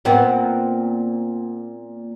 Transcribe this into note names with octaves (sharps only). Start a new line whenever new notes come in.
A#2 B3 C4